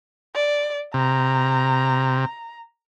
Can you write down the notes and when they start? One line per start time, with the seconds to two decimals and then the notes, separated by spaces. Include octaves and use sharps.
0.35 D5
0.94 C3 A#5